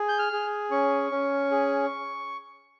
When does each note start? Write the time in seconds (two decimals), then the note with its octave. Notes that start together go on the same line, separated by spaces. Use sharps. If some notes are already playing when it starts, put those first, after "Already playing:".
Already playing: G#4
0.09 G6
0.19 F6
0.33 G#4
0.71 C#4 C#6
1.11 C#4
1.51 G#4